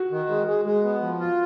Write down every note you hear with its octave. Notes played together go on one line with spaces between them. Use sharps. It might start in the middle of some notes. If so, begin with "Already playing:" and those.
Already playing: F#4
D#3
G#3
G#3
G#3
B3
F3
F4